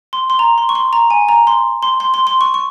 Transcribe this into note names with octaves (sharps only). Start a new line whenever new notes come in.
C6
C6
A#5
C6
C#6
C6
A#5
G#5
A#5
C6
C6
C6
C6
C6
C#6
C#6